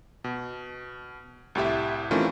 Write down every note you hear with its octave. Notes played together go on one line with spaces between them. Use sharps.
B2
C2 A2 G4 E5
D#3 E3 A3 C4 C#4 F4